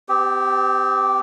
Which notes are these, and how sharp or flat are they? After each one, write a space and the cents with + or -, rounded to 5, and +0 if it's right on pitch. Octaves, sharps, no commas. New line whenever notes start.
C4 -45 G4 +0